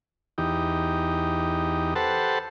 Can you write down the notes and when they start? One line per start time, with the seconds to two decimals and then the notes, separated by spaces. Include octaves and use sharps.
0.38 E2 D#4 G4
1.96 G4 A4 B4 C5 F#5 A5